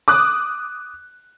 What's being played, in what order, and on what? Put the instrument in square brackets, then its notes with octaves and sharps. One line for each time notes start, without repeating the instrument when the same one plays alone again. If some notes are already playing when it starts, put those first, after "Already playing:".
[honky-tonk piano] D6 D#6 F#6